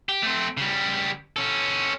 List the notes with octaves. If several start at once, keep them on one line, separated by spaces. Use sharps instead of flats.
G4
A3 C4
C#3 G3
C#4 A4